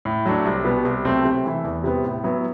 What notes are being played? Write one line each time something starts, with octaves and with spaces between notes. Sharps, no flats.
A2
F#3 A3 D4
C2
B2 G3 B3
C2
B2 F#3 A3 C4
C3
E3 A3 E4
E2
C3 G3 B3
A2
F#3 B3 E4